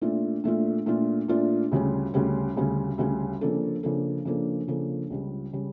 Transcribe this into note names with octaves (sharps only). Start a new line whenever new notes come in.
A#2 A3 D4 F4
A#2 A3 D4 F4
A#2 A3 D4 F4
A#2 A3 D4 F4
D2 C#3 G3 C#4
D2 C#3 G3 C#4
D2 C#3 G3 C#4
D2 C#3 G3 C#4
C#3 F3 A#3 D4 A4
C#3 F3 A#3 D4 A4
C#3 F3 A#3 D4 A4
C#3 F3 A#3 D4 A4
C#2 C#3 G3
C#3 G3